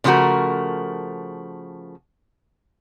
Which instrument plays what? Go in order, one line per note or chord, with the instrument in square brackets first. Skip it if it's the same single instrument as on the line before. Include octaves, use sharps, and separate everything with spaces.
[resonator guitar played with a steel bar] C#3 F3 A3 B3 F#4 A#4